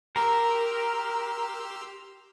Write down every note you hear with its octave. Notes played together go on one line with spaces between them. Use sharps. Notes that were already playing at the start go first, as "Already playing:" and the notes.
G4 A#4 A#5 C6 E6